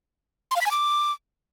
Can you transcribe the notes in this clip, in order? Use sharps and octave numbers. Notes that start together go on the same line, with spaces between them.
C6
F5
B6
G#5
D6